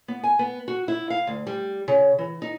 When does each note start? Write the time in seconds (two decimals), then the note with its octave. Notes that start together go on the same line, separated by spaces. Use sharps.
0.08 B3
0.24 G#5
0.39 B3
0.68 F#4
0.88 E4
1.10 F5
1.27 D2
1.47 G3
1.88 C#3
2.19 E3
2.42 D#4